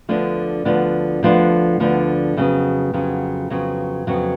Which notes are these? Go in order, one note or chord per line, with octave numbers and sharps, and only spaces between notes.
D2 D3 F3 B3 D4
D2 D3 F3 B3 D4
D2 D3 F3 B3 D4
D2 D3 F3 B3 D4
F2 C#3 F#3 B3
F2 C#3 F#3 B3
F2 C#3 F#3 B3
F2 C#3 F#3 B3